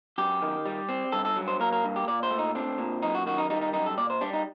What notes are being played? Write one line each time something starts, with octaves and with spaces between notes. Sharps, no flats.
F#2 G4
D#3
G3
C4
G2 A4
A4
F#3
C5
A#3 A#4
A#4
G2
G4
A#2 D5
C5
A3
D#4
C4 D4
A#2
F#2 D#4
F#4
D#3 F#4
D#4
G3 D#4
D#4
F#2 D#4
A4
A#2 D5
C5
G3 D4
D#4